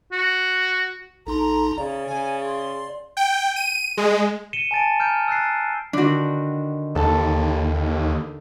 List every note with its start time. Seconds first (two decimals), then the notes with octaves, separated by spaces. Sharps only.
0.12 F#4
1.27 A#1 D#4 A4 A#5 C6
1.78 C#3 D5
2.07 C#3 G#5
2.45 C6
3.17 G5
3.56 D#7
3.97 G#3
4.53 C#7 D#7 E7 G7
4.71 G#5 A5 A6 D7
4.99 A#5 F6 G6 D7
5.28 E6 F#6 A6 C7
5.93 D3 D#3 D4 F#4
6.95 D#2 A4 A5